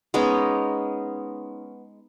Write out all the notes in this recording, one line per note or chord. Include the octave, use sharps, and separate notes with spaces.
G#3 B3 C#4 D#4